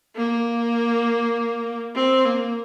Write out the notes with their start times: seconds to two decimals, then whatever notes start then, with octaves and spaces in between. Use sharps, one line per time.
0.16 A#3
1.95 C4
2.25 A#3